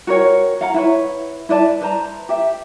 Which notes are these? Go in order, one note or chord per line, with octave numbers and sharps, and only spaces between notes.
F#4 A#4 C#5 G5
F5 F#5 A#5
E4 B4 C#5
E4 B4 D5 A5
B4 C5 A5 A#5
G4 E5